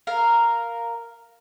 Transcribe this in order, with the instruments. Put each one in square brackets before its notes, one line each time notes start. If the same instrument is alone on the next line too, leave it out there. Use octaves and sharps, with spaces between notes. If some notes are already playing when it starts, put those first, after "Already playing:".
[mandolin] A#4 F5